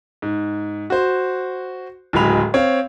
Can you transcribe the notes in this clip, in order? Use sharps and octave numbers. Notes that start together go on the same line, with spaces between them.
G#2
F#4 C5
D1 C#2 F#3 G#3 B5 F7
C4 C#5 F5